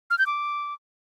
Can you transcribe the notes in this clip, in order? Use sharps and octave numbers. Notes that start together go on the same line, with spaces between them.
F6
G6
D6